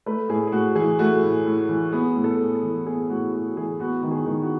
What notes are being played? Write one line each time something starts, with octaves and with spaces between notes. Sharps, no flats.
A3 B4
A2 G#4
G#4
A2 F#4
E3 G#4
A3 F#4
A2
A2
E3
B3 G#4
A2
A4
A2
A4
E3
B3 G#4
A2 F#4
A2 F#4
E3 G#4
B3 F#4
D#3
G#4
D#3
F#4